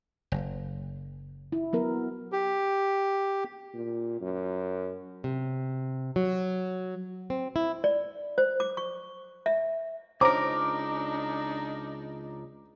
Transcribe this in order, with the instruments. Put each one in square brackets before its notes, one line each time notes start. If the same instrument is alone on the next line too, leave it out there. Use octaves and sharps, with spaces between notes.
[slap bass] F#1
[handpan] E4
F#3 B3 A#4
[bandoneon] G4
[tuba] A#2
F#2
[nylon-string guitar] C3
F#3
C4
E4
[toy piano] D5
C5
D6
C#6
E5
[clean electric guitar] C#2 A#4 [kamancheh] D4 D#4 [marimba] C5 C#5 A#5 [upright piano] D6